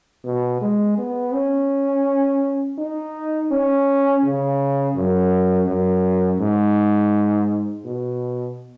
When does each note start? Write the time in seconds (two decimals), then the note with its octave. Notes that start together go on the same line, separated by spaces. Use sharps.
0.24 B2
0.61 G#3
0.98 B3
1.34 C#4
2.78 D#4
3.51 C#4
4.23 C#3
4.96 F#2
5.68 F#2
6.40 G#2
7.85 B2